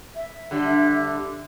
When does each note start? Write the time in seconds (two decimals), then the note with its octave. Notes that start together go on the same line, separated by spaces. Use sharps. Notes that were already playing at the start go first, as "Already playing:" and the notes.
0.15 E5
0.51 D3 G3